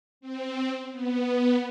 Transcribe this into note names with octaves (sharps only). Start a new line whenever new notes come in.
C4
B3